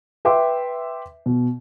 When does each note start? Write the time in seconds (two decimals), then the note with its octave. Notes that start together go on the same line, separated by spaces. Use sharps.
0.25 B4 E5 G5 C6 D6
1.26 B2